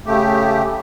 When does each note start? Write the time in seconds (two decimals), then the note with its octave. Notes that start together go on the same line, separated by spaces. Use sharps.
0.06 C#3 A3 G4